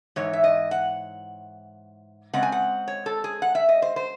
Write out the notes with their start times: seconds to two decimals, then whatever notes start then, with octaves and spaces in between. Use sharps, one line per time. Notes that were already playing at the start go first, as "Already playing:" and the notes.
0.16 G#2 E3 C#5
0.33 E5
0.44 D#5
0.71 F#5
2.33 C#3 G#3 C4 F#5
2.43 G#5
2.52 F#5
2.88 C#5
3.06 A4
3.24 G#4
3.42 F#5
3.55 E5
3.69 D#5
3.82 C5
3.96 C5